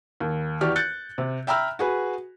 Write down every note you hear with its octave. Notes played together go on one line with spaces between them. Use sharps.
D#2
E2 G4 D5 C#6 F6
F#6 G6 A6 C#7
C3
E5 G5 A#5 B5 E6 F6
F#4 G#4 B4